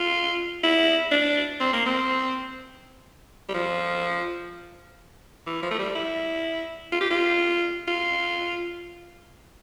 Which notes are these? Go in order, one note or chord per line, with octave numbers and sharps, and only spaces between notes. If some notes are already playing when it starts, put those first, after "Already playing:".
Already playing: F4
E4
D4
C4
A#3
C4
G3
F3
E3
F3
A3
G3
E4
F4
G4
F4
F4